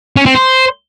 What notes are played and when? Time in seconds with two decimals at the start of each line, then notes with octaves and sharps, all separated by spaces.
0.16 C#4
0.26 C4
0.35 C5